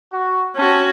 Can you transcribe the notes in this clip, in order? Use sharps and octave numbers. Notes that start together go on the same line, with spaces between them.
F#4
C4 C#4 F#4 G#5 A5